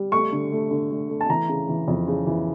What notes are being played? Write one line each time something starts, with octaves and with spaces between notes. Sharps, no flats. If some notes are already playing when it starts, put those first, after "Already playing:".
Already playing: G3
A3 C#6
D3
A3
D3
A3
A3
A5
E3 A#5
C#3
E3
F2
C#3
E3